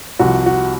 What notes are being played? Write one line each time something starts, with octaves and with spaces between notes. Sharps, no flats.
C2 C3 F3 F#4
F#4